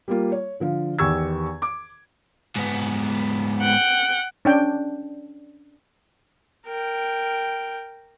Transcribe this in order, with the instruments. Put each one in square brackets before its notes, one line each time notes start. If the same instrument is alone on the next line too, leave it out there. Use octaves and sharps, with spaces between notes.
[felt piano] G3 A#3 F4
C#5
D3 F3 F5
E2 D#3 G4 C#6 E6 G#6
D6
[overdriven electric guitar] G#2 B3
[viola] F#5 G5
[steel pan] C#4 D4 G5
[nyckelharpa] A#4 G5